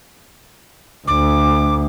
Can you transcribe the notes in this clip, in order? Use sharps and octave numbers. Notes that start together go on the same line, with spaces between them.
D2 D6